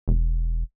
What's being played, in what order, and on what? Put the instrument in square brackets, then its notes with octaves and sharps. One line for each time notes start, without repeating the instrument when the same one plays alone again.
[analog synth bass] E1